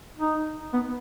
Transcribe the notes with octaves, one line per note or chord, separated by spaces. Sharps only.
D#4
B3